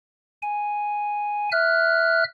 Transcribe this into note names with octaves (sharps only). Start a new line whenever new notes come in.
G#5
E5 F6 F#6